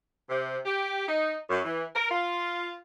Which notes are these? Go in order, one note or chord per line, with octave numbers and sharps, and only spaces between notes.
C3
G4
D#4
F#2
E3
A#4
F4